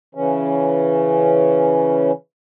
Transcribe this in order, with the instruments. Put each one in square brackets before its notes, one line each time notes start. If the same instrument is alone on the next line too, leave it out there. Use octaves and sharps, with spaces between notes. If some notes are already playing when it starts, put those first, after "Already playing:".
[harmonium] C#3 E3 C#4